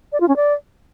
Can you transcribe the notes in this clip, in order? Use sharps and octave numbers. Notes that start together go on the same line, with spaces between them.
D5
F4
C#4
D5